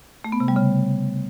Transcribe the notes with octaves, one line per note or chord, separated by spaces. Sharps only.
A3
B3
C3
G3
C#3